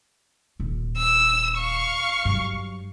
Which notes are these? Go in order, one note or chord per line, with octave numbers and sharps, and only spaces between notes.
D#1
E6
F5 C#6
G2 F#3